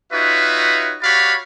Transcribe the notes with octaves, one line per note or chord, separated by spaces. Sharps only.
D#4 F4 F#4 B4 C#5 E5
F#4 G4 C#5 D5 F5 B5